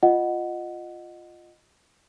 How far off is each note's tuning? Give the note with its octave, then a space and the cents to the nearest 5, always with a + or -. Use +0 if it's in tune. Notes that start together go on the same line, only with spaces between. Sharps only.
F4 +0 D#5 -15 F#5 +0